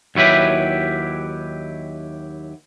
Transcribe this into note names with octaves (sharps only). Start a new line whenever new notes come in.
D#2 F#3 E4 G4 B4